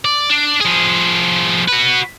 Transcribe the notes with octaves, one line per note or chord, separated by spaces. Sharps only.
D5
D4
F3 G#4
F#4 B4